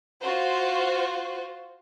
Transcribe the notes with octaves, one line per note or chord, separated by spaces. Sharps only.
F4 F#4 C5